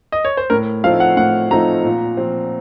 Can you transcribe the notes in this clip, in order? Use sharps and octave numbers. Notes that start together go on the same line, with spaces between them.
D#5
C#5
C5
A2 A#4
F3 A3 C4 D#4 F5
F#5
A2 F#5
F3 A3 C4 D#4 A#5
A#2
F3 C4